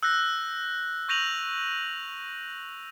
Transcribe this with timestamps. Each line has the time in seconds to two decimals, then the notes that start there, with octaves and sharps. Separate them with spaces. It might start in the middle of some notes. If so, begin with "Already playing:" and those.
0.03 E6 F#6 G6 A#6
1.08 C#6 G6 A#6 D#7 F7 F#7